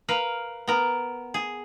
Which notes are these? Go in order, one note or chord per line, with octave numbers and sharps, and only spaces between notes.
A#4 B4 F5
B3 A#4
G#4